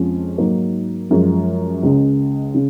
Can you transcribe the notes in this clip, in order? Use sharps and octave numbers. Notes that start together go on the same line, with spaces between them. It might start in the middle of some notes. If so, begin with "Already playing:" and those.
Already playing: F2 F3 G#3 C#4
G#2 F#3 A#3 D#4
F#2 F3 G#3
C#2 C#3 G#3
C#3